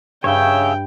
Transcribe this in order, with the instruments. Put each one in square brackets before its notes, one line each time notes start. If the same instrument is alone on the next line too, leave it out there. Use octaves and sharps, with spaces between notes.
[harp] G2 G6 [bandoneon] C#3 [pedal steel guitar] C#5 E5 [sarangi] G5